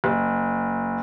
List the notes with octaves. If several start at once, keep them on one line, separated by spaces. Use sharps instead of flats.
F#1